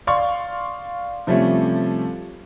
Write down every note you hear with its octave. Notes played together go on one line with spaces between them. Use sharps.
D5 F5 C6 C#6
C3 F3 G3 A3 C#4